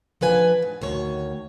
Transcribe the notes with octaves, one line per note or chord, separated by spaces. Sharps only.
F3 D4 B4 G#5
G#2
D2 D#3 C#5